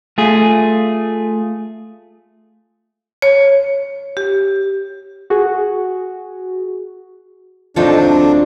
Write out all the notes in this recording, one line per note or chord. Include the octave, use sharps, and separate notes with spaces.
A3 F4 G#4
C#5
G4
F#4 G#4
D2 F#3 C4 D4 D#4 F4 A4